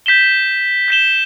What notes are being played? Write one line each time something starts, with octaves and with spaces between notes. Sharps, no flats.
G6 B6 E7 G7
G6 B6 E7 G7